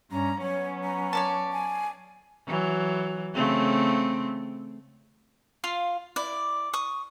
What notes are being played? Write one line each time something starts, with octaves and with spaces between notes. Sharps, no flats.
G2 C#4 A#5
F#3 B3 C#4 C#5
A#5
C#5 D5 A5
G#5
E3 F#3
C#3 A3 C4
F4 F5 C6
E4 D5
C#6 D#6